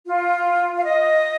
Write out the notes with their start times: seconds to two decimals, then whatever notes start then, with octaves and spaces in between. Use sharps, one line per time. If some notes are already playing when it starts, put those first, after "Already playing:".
0.06 F4
0.75 F5
0.83 D#5